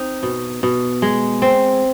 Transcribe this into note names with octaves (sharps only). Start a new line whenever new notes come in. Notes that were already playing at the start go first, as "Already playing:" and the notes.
Already playing: C4 D#4
B2
B2
G#3
C4